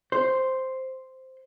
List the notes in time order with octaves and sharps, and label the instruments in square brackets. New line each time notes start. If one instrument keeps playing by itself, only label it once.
[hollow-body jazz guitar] C5